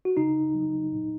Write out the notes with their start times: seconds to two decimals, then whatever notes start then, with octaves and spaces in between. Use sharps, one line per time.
0.05 F#4
0.17 C#3 D#4
0.54 F#3
0.92 A#2